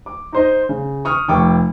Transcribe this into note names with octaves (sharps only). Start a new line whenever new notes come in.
D6
D#4 C5 D#5
C#3
C#6 D#6 F6
F1 G5 C#6 D6